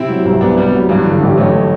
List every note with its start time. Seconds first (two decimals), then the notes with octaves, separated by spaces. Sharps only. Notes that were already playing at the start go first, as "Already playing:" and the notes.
Already playing: C3 C4 E4
0.09 F#3
0.25 C2
0.41 C2 B3 D4
0.57 C3 G3 B3
0.73 F#3
0.89 G2 E3 G3
1.05 D3
1.21 A1
1.37 A1 F#3 A3